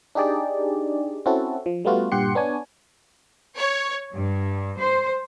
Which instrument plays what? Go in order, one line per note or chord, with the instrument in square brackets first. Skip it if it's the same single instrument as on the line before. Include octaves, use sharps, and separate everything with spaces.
[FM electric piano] D4 D#4 G4 G#4 D5
C4 C#4 E4 F#4 A4
F3
G3 A3 B3 F4 F#4
G2 A#2 G4 F#5 C6 C#7
B3 D4 C#5 G#5
[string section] C#5
G2
C5